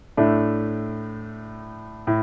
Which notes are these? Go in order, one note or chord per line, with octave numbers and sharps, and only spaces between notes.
A2 A3 D4
A2